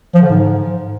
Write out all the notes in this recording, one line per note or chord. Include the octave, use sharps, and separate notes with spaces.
F3
D3
G#2